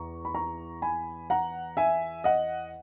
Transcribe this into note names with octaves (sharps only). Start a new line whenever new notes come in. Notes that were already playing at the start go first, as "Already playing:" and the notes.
Already playing: E2 A#5 C#6
B5
A#5 C#6
G#5 B5
F#5 A#5
E5 G#5
D#5 F#5